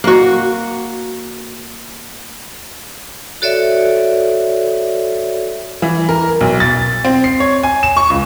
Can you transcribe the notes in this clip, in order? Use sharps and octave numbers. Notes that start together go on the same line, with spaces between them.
A#3 F#4
F#4 A4 C#5 D5 E5
E3
A#4
B1
A6
C4
C7
C#5
G#5
E7
C#6
C#2